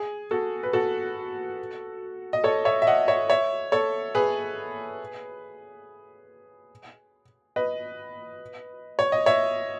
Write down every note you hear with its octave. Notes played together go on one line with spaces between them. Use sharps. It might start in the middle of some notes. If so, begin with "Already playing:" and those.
Already playing: G#4
F#4 A4
B4
F#4 A4
D#5
A4 C#5
C#5 E5
E5
D#5 F#5
C#5 E5
C#5 E5
A4 C#5
G#4 B4
B4 D#5
C#5
D#5
C#5 E5